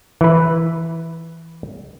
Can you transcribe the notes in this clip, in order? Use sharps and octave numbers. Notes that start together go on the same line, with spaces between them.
E3 B4